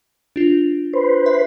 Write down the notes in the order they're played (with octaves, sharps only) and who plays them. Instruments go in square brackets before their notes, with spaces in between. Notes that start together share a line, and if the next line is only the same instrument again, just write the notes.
[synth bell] D4 F4
[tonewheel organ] B4 C5
[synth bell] E5